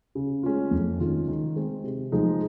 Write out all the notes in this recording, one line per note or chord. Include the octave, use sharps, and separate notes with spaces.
C#3
G#3 C#4 F4
F2
D#3 G#3 C#4 F4
D#3
G#3 C4
C3
F3 G#3 D#4